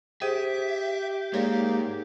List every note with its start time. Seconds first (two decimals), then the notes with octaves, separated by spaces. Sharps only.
0.22 G4 G#4 C5 E5
1.34 G#2 G#3 A#3 C#5 D5 F5